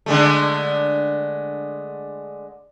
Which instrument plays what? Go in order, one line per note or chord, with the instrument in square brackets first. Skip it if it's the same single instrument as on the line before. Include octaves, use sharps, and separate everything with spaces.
[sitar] D3 G#3 A3